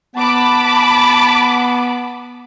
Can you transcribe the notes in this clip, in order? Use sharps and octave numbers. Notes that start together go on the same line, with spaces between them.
B3 A5 B5 D6